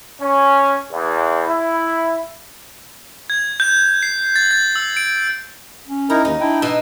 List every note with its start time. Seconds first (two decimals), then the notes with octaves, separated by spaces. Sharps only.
0.21 C#4
0.91 E2
1.47 E4
3.30 G#6
3.60 G6
4.03 C7
4.36 A6
4.51 A6
4.76 E6
4.97 D7
5.87 C#4
6.10 D#4 E4 A#4 A#5
6.25 D#2 D#4
6.40 D4 E4 G5
6.62 B2 D#4 E6